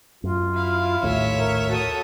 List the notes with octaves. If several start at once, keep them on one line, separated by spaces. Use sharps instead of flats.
F#2 F4
E4 F5
A#1 D#2 A2 C#5 E5
A#4
F#4 A4 D#6